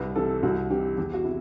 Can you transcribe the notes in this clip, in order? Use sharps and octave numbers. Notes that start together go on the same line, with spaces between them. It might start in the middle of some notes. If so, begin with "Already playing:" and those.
Already playing: C2 B4
C3 E3 A4
C2 F#4
C3 E3 G4
E2 G4
F#4
C3 E4